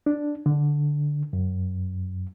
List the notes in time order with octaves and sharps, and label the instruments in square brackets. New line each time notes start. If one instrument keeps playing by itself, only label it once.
[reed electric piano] D4
D3
F#2